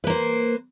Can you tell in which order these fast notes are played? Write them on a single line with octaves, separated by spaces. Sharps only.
B4 A#3 C5